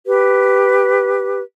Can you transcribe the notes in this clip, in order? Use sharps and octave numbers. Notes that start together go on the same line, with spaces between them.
G4 B4